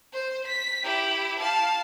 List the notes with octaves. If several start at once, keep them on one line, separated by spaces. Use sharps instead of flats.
C5
B6
E4 G4
F5 A5